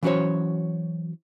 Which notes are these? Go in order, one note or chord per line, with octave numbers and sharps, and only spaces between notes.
E3 F#3 C#4 F#4 C5 C#5